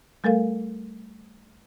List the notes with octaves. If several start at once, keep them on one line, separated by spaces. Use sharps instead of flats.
G3 A3 A4 A#4 F5